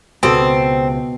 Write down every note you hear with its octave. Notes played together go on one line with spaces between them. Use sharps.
C#2 B2 C4 A4